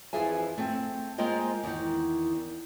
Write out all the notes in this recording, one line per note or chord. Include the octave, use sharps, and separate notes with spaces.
F2 E3 F4 G#4 E5 G#5
A3 C4
G#3 A#3 F4 C5 D#5 G5
E2 D#3